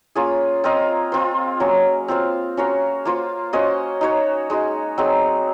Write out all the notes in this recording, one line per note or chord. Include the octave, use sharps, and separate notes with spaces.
A#3 C#4 F4 G#4
C4 F4 A#4 D#5
C4 F4 C5
F#3 A#3 C#4
C4 F4 C5 F5
C#4 F#4 A#4 F5
A#3 F4 C5
C#4 F#4 C5 D#5
D#4 F#4 C#5
G#3 D#4 F#4
F#3 C4 D#4 G#4